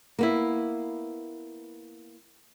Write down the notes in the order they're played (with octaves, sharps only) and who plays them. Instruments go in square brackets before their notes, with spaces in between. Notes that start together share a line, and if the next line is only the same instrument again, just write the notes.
[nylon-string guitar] A#3 B3 E4